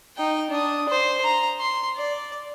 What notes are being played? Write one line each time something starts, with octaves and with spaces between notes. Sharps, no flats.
D#4 G5
D4 D#6
C5
A#5
C6
D5